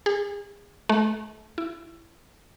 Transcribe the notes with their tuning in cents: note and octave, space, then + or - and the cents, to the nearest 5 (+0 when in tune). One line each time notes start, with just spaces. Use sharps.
G#4 -35
A3 -35
E4 +20